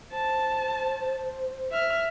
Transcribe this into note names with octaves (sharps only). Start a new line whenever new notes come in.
C5 A5
E5 F6